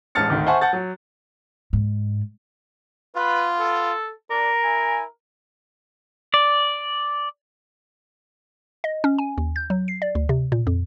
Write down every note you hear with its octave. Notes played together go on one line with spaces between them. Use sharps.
A1 G#2 A5 F6 A6 C#7
G#1 D2 D#3
C5 E5 F#5 G#5 A5 C#6
F#5 A5 G6 A6
F#3
G#2
B3 F4 B4
A4
D4 A#4 D5
E4 G#5
D5
D#5
C#4
G#5
D#2
G6
F#3
C7
D5
D2
C3
A#2
F2